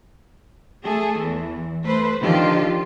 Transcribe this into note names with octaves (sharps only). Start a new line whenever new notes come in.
A3 G#4 A4
E2 E3
A3 B4 C5
D3 D#3 F3 F4 G4